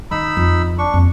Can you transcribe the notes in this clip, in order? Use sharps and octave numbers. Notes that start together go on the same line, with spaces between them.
D#3 D#4 B5 E6
F2
D4 C#6
F2 B3